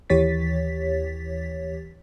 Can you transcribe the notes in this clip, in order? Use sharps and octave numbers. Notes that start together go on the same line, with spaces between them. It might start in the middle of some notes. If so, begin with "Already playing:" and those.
D#2 E3 G4 C#5 A6 B6